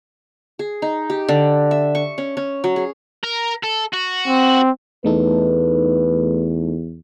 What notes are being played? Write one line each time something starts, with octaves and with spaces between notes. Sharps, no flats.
G#4
D#4
G4
D3
E5
C#6
C#4
C#4
F#3
G#4
A#4
A4
F#4
C4
E2 A3 D#4 A4 B4